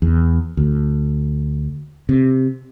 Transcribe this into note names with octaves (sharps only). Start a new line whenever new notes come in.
E2
D2
C3